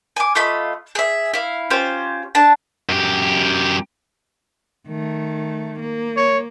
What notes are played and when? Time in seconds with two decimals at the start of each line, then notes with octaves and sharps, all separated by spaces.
0.16 G#5 D6
0.35 A3 F4 D#5 B5
0.95 G#4 E5
1.34 E4 F5
1.70 C#4 F4 G4 C5
2.35 D4 A5
2.89 F#2 G4
4.87 D#3 A3
5.80 A#3
6.17 C#5